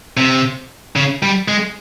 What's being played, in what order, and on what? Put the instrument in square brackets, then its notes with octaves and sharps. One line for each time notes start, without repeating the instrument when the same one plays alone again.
[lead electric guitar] C3
C#3
G3
G#3